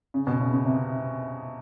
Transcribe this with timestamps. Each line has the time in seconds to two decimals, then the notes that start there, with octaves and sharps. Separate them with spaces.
0.14 C#3
0.27 B2
0.40 C#3
0.53 C#3
0.66 C3